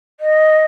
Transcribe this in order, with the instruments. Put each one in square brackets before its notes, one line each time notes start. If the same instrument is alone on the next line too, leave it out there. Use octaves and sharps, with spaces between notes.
[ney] D#5